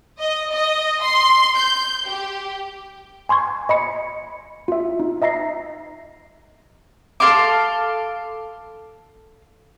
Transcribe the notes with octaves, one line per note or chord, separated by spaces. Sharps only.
D#5
D#5
C6
G6
G4
G#5 C6 C#6 G#6
D#5 B5 C#7
F4 E5
D#4
D#5 E5 A#5 A#6 C7
A4 F5 C6 D6